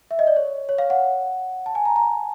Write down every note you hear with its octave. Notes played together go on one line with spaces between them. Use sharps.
E5
D#5
D5
C#5
C#5
F5
F#5
A5
G#5
A#5
A#5